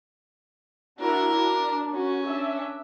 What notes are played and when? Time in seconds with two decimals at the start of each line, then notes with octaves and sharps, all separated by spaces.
1.00 D4 E4 F#4 A#4
1.36 D4
1.93 C#4 F#4
2.27 D4 E5